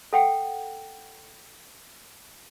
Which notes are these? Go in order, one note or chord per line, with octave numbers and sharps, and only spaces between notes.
A4 F#5 G5